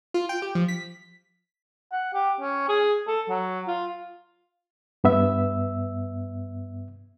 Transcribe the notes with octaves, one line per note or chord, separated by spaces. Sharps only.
F4
G5
G4
F3
B6
F#5
G4
C#4
G#4
A4
F#3
F4
G2 B3 E5 E6